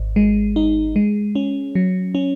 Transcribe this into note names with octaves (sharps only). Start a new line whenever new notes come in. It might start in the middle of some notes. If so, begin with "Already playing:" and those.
Already playing: G#1
G#3
D#4
G#3
C#4
F#3
C#4